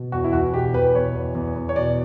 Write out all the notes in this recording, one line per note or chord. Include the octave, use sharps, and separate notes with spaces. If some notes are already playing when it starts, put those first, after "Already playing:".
Already playing: B2
E2 F#4
E4
E2 F#4
B2 G4
E2 B4
B2 C#5
E2
E2
E2
C#5
B2 D5